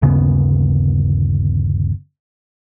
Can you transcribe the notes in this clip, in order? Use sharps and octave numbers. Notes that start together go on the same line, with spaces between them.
G1 D#2 C#3 B3